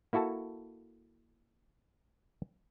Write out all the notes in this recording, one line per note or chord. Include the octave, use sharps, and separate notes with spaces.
A#3 E4 F#4 A4 A5